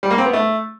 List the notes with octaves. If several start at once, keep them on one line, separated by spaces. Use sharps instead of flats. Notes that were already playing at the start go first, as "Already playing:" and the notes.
G3
A#3
C4
B3
A3